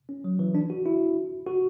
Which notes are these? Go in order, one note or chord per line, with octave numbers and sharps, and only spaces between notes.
C#4
F#3
E3
D4
F#4
E4
F#4